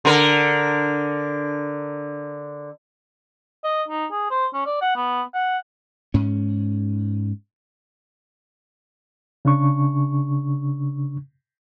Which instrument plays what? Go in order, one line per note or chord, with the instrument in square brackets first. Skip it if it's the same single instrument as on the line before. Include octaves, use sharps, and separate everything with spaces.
[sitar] D3 A#4
[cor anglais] D#5
D#4
G#4
C5
C#4
D5
F#5
B3
F#5
[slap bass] G#2 C#4
[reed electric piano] C#3 D4 C#6